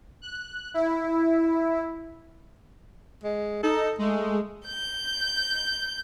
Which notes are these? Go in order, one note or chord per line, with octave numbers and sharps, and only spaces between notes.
F#6
E4
G#3
D#4 A4
G#3 A3
G6